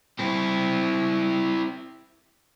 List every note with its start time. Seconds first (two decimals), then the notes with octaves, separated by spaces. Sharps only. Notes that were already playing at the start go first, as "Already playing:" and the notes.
0.19 C4 E4